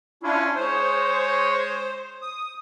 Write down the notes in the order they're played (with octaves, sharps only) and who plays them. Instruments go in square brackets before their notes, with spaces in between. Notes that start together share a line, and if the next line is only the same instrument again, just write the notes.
[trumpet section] C#4 [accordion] D4 E4 F4
[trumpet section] G#3 G#4 C#5 [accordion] C5
[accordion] D#6